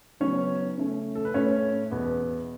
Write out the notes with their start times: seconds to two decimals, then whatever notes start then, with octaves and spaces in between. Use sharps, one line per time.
0.20 C#3 F#3 B3 C#4 C#5
0.78 C#3 A3 C#4
1.15 A4
1.25 B4
1.34 A2 A3 C#4 C#5
1.91 E2 B2 B3